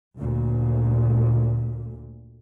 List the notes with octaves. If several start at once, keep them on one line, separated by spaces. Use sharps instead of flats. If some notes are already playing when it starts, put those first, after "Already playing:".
D2 A#2